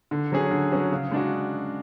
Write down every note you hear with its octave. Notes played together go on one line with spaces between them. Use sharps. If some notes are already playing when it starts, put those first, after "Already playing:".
D3
F#3 C#4 G#4
D3
F#3 C#4 G#4
C#3
G#3 D4 F#4